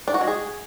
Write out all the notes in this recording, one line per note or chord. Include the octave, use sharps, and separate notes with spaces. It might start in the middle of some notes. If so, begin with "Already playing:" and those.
D4
F#4
G#3
G#4